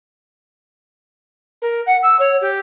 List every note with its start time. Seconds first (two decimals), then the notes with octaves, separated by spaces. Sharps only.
1.62 A#4
1.86 F#5
2.03 E6
2.19 C#5
2.41 G4